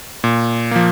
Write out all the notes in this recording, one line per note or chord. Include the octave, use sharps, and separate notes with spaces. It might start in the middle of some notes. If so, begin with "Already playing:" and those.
A#2
F3 A#3